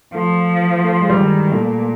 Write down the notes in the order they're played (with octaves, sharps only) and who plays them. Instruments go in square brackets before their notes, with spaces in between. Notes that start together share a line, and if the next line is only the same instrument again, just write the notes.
[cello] F3 [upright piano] A3
[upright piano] A3
G#3
G3
[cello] D#3
[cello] A#2 [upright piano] A3